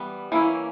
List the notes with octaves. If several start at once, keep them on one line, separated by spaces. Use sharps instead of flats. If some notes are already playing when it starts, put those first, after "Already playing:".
Already playing: E3 G3 B3
E3 A#3 C#4 E4